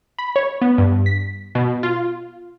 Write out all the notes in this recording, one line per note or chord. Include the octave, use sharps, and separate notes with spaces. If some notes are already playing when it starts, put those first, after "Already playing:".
B5
C#5
B3
G2
B6
B2
F4